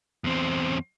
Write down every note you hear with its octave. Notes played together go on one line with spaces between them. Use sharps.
E2 C4